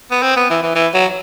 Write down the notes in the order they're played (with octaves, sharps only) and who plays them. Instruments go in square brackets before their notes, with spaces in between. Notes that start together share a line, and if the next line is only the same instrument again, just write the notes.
[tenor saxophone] B3
C4
B3
E3
E3
E3
F#3